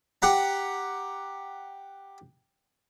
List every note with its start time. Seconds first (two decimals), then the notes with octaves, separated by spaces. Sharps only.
0.22 G4 F#5 A#5